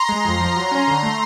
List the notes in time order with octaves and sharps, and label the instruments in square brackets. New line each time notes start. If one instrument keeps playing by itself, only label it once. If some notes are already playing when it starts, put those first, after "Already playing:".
Already playing: [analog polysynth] A#5 C6
G#3
F2
F3
F#3
C#4
D3
A3